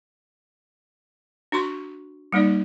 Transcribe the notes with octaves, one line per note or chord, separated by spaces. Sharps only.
D4 F#4 C6 C#6
G3 A#3 D#4 D5